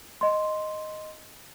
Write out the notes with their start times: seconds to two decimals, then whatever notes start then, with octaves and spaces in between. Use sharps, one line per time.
0.21 D#5 C6